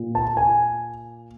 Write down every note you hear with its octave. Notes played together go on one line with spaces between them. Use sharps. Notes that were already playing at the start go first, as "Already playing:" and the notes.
Already playing: A#2
A5
G#5